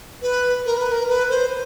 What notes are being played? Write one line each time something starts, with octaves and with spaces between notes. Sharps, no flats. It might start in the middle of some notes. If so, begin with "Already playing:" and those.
B4
A#4
B4
A#4
B4
C5